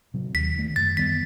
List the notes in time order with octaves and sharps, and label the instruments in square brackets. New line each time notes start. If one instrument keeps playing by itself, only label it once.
[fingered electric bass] C3 F#3
[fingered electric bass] D#2 [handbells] B6
[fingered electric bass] D#3 A3
[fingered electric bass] F#2 [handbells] A6
[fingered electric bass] D#3 G3 B3 [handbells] B6